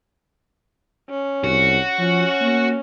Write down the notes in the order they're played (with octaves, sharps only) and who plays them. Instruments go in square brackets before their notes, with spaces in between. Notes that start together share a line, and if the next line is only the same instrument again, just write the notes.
[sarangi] C#4
[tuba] C2 [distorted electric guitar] F#4
[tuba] F3 [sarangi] C#4
[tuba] A#3